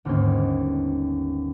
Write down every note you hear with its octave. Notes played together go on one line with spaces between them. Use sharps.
G1 D#2 G#2 C#4 C5 G#6